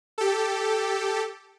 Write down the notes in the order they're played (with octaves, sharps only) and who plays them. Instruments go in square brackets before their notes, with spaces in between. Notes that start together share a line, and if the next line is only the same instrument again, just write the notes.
[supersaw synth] G4 A4